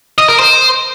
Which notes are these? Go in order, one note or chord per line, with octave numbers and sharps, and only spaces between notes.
D#5
A#4
C5